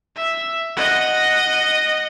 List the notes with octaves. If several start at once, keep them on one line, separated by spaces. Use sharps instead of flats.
E5
D#5 F#5